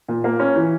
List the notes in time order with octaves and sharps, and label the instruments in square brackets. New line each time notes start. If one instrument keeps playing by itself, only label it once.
[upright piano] A#2
A#3
C#4
E3